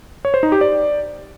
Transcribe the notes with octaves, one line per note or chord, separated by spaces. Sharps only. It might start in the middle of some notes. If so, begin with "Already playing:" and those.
C#5
C5
D#4
G4
D5